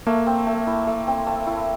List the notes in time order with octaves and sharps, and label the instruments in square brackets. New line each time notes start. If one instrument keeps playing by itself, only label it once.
[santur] A3 [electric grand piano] A#3
[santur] C4
A3
E4
A3
C4
A3
E4